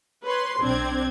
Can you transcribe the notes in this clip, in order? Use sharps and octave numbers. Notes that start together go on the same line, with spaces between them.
B4 C#5 C6
B1 C4 D4 G#6